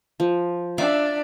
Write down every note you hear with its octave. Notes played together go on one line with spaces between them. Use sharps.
F3
D4 D5 E5 F5 D6